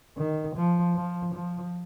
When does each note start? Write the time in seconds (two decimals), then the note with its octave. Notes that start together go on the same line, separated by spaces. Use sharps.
0.17 D#3
0.56 F3
0.95 F3
1.34 F3